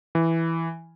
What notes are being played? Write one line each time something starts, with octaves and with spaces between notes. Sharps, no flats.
E3